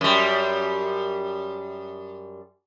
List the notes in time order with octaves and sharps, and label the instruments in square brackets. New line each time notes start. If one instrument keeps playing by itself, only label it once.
[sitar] F#2 G3